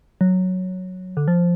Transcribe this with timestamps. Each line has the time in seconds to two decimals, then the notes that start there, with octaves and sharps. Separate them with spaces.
0.21 F#3
1.17 D3
1.28 F3